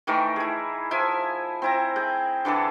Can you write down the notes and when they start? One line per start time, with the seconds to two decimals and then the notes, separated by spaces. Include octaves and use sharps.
0.07 D#3 E3 A3 A#4
0.36 E4 G#4
0.91 F3 E4 E5 G#5
1.62 C4 E4 A#5
1.96 G#4 G5
2.45 D3 E3 G#4 A4